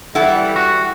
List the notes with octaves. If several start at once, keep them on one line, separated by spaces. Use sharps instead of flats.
E3 G3 E4 A4 F#5
F#4